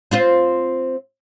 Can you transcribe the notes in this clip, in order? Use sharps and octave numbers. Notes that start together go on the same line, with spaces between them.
C4 F4 C5